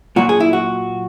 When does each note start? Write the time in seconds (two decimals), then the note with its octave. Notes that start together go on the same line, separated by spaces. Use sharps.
0.16 A#2 F#3 F#4
0.29 G#4
0.40 E4
0.53 F#4